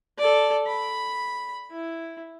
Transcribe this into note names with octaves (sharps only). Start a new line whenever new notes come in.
A4 D5
B5
E4